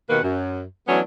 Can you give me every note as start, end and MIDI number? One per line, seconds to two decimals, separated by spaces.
0.10 0.22 39
0.10 0.22 47
0.10 0.22 51
0.10 0.22 58
0.10 0.22 71
0.10 0.22 78
0.23 0.62 42
0.88 1.00 52
0.88 1.00 54
0.88 1.00 57
0.88 1.00 59
0.88 1.00 61
0.88 1.00 62